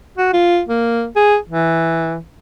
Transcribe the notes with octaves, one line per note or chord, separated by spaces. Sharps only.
F#4
F4
A#3
G#4
E3